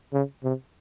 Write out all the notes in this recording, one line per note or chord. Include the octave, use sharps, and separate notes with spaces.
C#3
C3